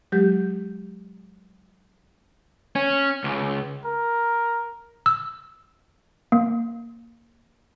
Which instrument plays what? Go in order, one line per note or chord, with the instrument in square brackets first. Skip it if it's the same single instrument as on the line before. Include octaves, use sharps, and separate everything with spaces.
[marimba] F#3 G#3 G4 G6
[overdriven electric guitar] C#4
C#2
[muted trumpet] A#4
[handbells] E6
A#3